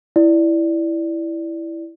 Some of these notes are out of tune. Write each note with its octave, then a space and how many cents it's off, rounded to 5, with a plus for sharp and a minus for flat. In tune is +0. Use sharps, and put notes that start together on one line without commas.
E4 +0 D5 +0